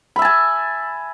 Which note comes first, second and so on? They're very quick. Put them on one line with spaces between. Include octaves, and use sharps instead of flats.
B5 E5 A5 G#5